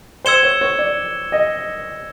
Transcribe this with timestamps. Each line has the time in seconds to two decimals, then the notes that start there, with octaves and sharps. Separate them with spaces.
0.25 C5 E6 G#6 C#7 E7 G7
0.43 C#5
0.61 C#5
0.79 D5
1.32 D#5